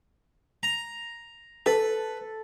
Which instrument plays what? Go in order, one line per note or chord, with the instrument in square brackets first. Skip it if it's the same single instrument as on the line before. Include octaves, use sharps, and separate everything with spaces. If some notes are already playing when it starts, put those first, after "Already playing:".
[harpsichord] A#5
[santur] A4 [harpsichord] B4